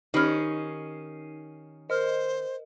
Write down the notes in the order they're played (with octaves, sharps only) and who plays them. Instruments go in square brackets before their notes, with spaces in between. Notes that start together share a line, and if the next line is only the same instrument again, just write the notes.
[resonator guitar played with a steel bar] D#3 C#4 [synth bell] D#4 C7 D#7 [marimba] G4 B5 F6
[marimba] A#4 F6 [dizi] C5 [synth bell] D#5